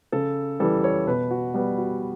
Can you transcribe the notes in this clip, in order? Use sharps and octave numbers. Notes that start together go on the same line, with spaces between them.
C#3 A4
E3 G3 A4
C#5
B2 B4
F#4
G3 B3
F#4